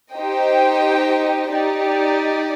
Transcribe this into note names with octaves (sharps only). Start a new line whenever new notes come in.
D#4 G4 C5 D#5 G5
D#4 G4 D5